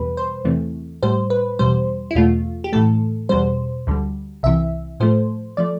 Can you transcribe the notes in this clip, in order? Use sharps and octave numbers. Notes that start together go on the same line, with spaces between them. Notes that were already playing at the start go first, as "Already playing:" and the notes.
Already playing: E2 B2 G3 B4
C5
E2 C3 E3 A3
A2 G3 C5
B4
E2 B2 G3 C5
E4
E2 B2 A3 F4
G4
A2 E3 A3 A4
E2 B2 G3 C5
D2 D3 G3
C2 C3 E3 E5
A2 F3 A3 C5
F3 A3 D5